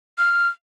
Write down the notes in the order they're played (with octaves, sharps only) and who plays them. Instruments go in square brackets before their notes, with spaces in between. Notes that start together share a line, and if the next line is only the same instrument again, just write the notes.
[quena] F6